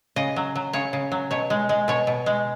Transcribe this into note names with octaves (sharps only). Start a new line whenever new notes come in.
C#3 D#5
F#3
F#3
C#3 C#5
C#3
F#3
B2 C#5
G#3
G#3
B2 C#5
B2
G#3